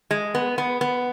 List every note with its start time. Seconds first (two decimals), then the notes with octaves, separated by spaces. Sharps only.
0.11 G#3
0.35 B3
0.58 B3
0.81 B3